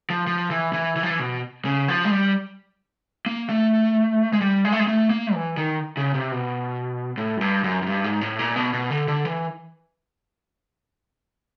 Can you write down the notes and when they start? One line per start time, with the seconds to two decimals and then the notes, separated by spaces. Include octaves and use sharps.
0.10 F3
0.27 F3
0.50 E3
0.73 E3
0.96 E3
1.03 F3
1.10 E3
1.19 B2
1.65 C#3
1.88 F3
2.05 G#3
2.11 G3
3.26 A#3
3.49 A3
4.33 G#3
4.41 G3
4.65 G#3
4.72 A3
4.80 G#3
4.87 A3
5.10 A#3
5.34 E3
5.57 D#3
5.97 C#3
6.14 C3
6.32 B2
7.18 A2
7.37 F#2
7.41 G2
7.64 F#2
7.82 F#2
7.87 G2
8.04 G#2
8.21 A2
8.39 A#2
8.56 B2
8.73 B2
8.90 D3
9.08 D3
9.25 E3